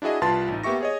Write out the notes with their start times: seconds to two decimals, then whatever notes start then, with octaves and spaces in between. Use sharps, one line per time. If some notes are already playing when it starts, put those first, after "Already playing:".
0.02 D4 E4 F#4 G#4 D#5
0.21 C2 F4 B4 A5 C6 A6
0.48 A1 D#4
0.63 A#3 B3 G4 E5 C#6 A#6
0.81 G#4 C#5 D#5